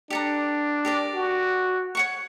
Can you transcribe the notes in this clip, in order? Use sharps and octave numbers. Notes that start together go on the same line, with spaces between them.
D4 G4 A4 A#5
G4 A#4 D5
F#4
C#5 F#5 C#6